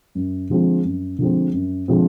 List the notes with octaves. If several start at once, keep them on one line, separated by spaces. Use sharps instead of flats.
F#2
D3 F3 G#3 C4
F#2
D3 F3 G#3 C4
F#2
D3 F3 G#3 C4